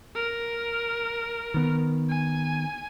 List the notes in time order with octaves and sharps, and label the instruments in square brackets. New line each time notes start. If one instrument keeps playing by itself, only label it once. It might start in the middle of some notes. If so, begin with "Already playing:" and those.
[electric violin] A#4
[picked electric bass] D#3 B3
[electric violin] G#5